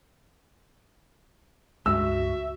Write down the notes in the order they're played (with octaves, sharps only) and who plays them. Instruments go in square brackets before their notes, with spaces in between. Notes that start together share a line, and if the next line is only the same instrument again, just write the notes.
[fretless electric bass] C#2 G2 G#3 [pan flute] F#4 [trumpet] E5 [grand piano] E6